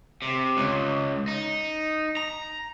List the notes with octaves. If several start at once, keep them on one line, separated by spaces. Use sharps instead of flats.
C3
C#2
D#4
A#5